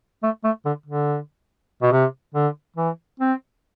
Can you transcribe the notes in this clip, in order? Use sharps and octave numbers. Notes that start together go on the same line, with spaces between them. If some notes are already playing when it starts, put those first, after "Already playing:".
A3
A3
D3
D3
B2
C3
D3
E3
C4